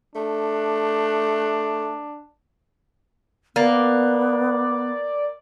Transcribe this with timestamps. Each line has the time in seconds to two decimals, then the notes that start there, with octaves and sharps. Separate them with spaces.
0.15 A3 D4
3.56 A#3 B3 D5